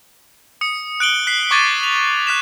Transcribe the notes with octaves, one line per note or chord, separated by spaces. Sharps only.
D#6 C#7
F#6 D7 F#7 G7
F#6 B6 C7
C#6 D6 G#6 A6 D#7
F7
F#6 B6 E7